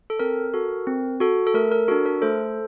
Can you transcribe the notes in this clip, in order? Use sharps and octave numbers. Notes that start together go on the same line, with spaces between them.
A4
C4 A#4
F#4 A4
C4
F#4 A4
A4
A3 A#4
A#4
D4 F#4 A4
A#4
A3 A4 C5